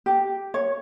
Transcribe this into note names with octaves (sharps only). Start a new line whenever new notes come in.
G4
C#5